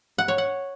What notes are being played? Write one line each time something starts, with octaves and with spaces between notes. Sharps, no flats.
F#5
C#5
F#5